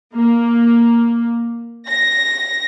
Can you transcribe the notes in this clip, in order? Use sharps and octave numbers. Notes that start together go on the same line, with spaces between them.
A#3
A#6